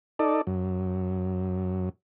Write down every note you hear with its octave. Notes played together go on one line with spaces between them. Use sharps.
D#4 A4 D5
F#2